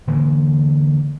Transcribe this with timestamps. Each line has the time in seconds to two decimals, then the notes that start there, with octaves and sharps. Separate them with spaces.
0.07 D3 E3 G#3 A#3